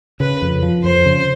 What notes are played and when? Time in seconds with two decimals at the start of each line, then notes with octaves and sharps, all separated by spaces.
0.20 C#3 B4
0.42 F2
0.63 F3
0.84 F2 C5
1.05 C#3